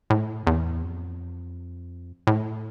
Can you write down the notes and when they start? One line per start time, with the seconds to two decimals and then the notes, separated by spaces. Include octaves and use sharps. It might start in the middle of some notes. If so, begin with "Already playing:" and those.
0.10 A2
0.47 E2
0.82 F2
2.27 A2